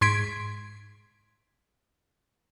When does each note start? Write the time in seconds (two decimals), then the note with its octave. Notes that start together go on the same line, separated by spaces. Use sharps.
0.01 G#2 C6 G#6 B6 D7